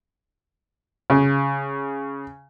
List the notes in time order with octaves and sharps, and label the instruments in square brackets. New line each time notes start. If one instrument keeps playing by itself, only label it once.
[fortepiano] C#3